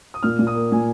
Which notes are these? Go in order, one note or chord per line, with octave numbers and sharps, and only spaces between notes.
D#6
A#2 F6
A#2
D#6
A#3
A#2 G#5